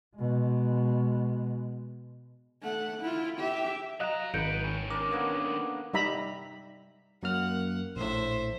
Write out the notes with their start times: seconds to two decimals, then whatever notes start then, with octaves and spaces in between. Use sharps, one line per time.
0.16 B2 G#3
2.62 A3 F#5
3.02 E4 F4
3.39 G4 E5
4.00 F#3 D#5 F5 A#5 F#6 E7
4.34 G#1 F#3 B4 G6 C#7 D7
4.64 D#3 C#4
4.90 D4 A#4 D6
5.11 D3 A#3 B3
5.94 G3 D#4 E5 A#5 B5
7.23 F#2 A#3 F#5 F6
7.96 A#1 A2 C5 E5